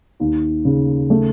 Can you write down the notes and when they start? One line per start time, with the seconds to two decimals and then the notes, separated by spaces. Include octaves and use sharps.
0.20 D#2
0.65 C#3
1.10 A3